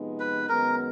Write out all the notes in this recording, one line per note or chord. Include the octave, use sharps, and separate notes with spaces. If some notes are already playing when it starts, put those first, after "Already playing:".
Already playing: C3 F3 G#3 B3 D#4
B4
F#2 D#3 G#3 B3 A#4